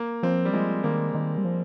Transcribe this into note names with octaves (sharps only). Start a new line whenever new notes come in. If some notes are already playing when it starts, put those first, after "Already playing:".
Already playing: A#3
F3 C4
G3
F3 G#3
D#3 A#3
D#3
G3
F3